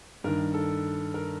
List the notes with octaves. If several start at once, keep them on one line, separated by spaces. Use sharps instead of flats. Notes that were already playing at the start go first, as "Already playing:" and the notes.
G2 D#3 A#4
A4
A#4